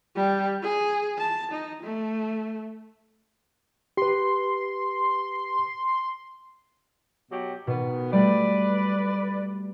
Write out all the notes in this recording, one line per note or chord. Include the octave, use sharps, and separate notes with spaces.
G3
G#4
A5
D#4
A3
G4 B4 C6
B2 F#3 G4
B2 D#3 B3
G3 A3 B4 D5